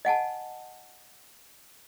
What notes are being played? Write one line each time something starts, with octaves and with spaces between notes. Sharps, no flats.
D#5 F#5 G#5 A5